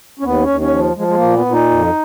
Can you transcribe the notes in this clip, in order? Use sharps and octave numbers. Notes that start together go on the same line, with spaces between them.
C#4
D#2 B3
C#4
D#2
C#4
F3
F3 G#3
G#3
A#3
A#2
B3
A#2
D#4
F2